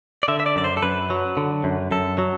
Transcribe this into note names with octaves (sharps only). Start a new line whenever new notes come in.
D5
D3 E5
E5
D5
F#2 D5
C5
A4
F#2 B4
F#3
D3
F#2
F#2 A4
F#3